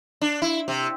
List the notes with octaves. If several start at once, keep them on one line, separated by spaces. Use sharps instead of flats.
D4
E4
C3